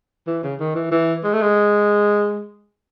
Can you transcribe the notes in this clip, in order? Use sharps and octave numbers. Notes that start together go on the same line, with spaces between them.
E3
C#3
D#3
E3
E3
G#3
A3
G#3